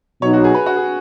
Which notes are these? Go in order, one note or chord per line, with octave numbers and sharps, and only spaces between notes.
B2 F#3 D#4 C#5
F#4
G#4
B4
F#4
G#4